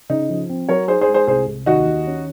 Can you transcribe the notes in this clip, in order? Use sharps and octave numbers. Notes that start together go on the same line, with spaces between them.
C#3 D#4
F3
C4
F#3 A#4 C#5
D#4 G#4 C5
G#4 C5
G#3
G#4 C5
C2 G#4 C5
C2
D#2 D#4 F#4
D#3
C#4